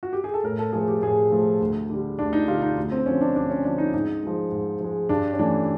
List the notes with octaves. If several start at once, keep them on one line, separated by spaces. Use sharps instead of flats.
F#4
G4
G#4
A4
A2 A#4
A4
F3 A3 G#4
G4
A2 G#4
F3 A3
D2
D3 G3
D2 D4
D#4
D3 G3 F4
D#4
D2
C4
D3 F3 C#4
D4
D2 D4
C#4
D3 F3 D4
D#4
G#2 D#4
F3 G#3
G#2
F3 G#3
G2 D4
C#4
E3 A3 D4